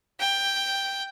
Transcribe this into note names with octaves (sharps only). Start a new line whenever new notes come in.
G5